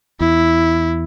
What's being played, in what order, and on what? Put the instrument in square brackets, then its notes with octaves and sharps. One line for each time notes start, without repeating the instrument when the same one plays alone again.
[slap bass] E2 [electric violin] E4